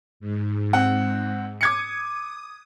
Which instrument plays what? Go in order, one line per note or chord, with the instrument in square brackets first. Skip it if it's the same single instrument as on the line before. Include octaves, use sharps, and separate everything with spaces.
[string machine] G#2
[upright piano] C4 F#5
[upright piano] D6 G#6 C#7 [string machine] D#6